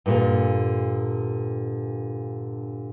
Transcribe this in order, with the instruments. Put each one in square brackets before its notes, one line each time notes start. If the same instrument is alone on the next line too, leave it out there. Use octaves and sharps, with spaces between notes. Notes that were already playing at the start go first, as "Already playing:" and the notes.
[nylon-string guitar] G2 A#2 D3